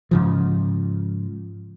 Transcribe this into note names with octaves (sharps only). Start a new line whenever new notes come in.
G#2 C#3 F3